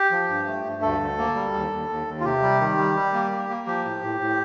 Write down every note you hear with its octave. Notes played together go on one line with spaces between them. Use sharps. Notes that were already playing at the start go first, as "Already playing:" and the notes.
Already playing: G4
F3
G2
A3
G2
D2 A4
D2
A#3
G3
D#2
D#2
D#2
D#2
F4
C3 G4
G3
D#3
G3
G3
A#3
A#3
A#3
F3 G4
A2
A2
A2